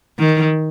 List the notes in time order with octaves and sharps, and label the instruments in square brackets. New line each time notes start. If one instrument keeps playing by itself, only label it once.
[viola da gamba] D#3